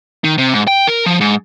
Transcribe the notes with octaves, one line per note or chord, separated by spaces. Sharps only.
D#3
C3
G#2
G5
A#4
F3
G#2